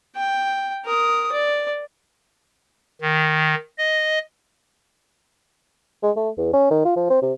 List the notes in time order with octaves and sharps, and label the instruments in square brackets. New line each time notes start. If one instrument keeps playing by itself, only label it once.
[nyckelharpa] G5
A#4 D#6
D5
[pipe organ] D#3
D#5
[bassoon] G#3
A3
E2
C#4
D#3
F4
F3
C4
C3